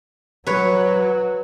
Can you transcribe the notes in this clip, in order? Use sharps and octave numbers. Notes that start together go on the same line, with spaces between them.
F#3 B4 C#5